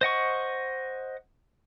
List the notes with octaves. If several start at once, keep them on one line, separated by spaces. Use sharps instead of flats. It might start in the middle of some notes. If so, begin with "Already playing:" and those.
C5 D#5 F#5 C#6